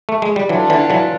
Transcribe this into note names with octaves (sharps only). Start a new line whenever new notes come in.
A3
G#3
G3
E3 F#3 D4 F4 A4
D3 E3
E3 F#3